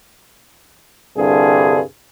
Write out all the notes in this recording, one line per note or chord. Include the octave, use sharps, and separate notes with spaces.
C2 G2 D3 G#4